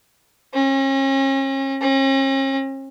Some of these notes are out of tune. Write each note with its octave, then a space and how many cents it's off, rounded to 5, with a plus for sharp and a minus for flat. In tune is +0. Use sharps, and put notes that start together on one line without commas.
C#4 -40
C#4 -45